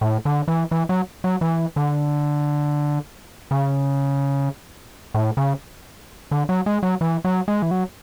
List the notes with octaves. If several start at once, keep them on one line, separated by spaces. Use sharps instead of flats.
A2
D3
E3
E3
F#3
F#3
E3
D3
C#3
A2
C#3
D3
F#3
G#3
F#3
E3
F#3
G#3
E3
F#3